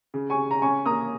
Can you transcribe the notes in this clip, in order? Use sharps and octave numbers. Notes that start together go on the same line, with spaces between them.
C#3
G#5 C#6
C#3
A#5
C#4 G#5 C#6
A#3 A#5 D#6